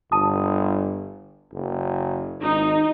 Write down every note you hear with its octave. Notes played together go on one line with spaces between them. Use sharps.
G1 A5 D#6
F#1
G#1 D#4